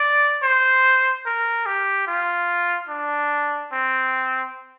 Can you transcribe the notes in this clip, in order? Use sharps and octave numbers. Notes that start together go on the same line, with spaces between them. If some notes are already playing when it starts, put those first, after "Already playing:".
Already playing: D5
C5
A#4
G4
F4
D4
C4